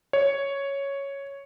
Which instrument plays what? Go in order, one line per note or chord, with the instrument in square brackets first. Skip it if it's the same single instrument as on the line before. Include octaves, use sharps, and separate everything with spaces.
[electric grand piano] C#5